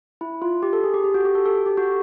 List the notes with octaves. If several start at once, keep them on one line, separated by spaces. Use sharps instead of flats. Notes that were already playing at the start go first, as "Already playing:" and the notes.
E4
F4
G4
A4
G#4
G4
G4
F#4
G4
A4
A4
G4
F#4